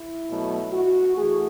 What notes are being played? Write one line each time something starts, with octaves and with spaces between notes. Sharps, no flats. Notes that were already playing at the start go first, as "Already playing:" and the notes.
Already playing: E4
B2 F#3 A3
F#4
E3 A3 G#4